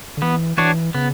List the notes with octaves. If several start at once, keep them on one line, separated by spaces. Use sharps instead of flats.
D3
E3 B3
E3 D4 F#4 C#5
C#3 B3